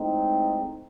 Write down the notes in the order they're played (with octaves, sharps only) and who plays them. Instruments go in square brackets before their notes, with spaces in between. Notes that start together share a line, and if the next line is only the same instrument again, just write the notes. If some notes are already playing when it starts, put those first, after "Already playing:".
Already playing: [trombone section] A2 G#3 C4 D#4